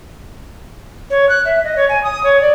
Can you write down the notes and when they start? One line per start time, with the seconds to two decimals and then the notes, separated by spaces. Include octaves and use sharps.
1.10 C#5
1.29 F#6
1.45 E5
1.64 D#5
1.76 C#5
1.89 G#5
2.03 D#6
2.24 C#5
2.41 D5